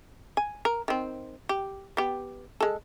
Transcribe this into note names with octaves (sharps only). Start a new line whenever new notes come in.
G#5
A#4
D#3 C4
G4
B3 G4
G#3 A4